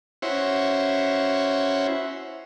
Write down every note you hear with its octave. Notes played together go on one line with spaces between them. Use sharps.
C#4 E4 F#4 C5